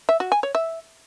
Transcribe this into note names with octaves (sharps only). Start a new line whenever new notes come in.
E5
F#4
G#5
C#5
E5